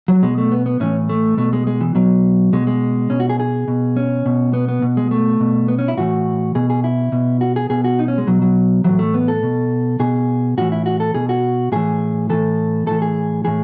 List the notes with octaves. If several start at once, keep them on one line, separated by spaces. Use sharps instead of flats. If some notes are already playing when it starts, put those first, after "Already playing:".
F#3
B2 G#3
A3
B3
B3
A2 E3 C#4
A3
B2 A3
G#3
G#3
E3
B2 F#3
B2 G#3
G#3
B2 C#4
F#4
G#4
G#4
B2
C#4
B2
B3
B3
B2
G#3
A3
B2
B3
C#4
E4
A2 E3 F#4
B2 G#4
G#4
E4
B2
F#4
G#4
B2 G#4
F#4
D#4
C#4
G#3
B2 F#3
F#3
A2 E3 F#3
A3
B3
A4
B2
B2 G#4
A2 E3 F#4
E4
F#4
A4
B2 G#4
F#4
A2 E3 G#4
A2 E3 A4
A2 E3 A4
G#4
A2 E3 G#4